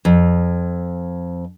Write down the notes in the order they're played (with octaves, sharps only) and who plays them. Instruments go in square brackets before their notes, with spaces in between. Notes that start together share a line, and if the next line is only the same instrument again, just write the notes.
[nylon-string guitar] F2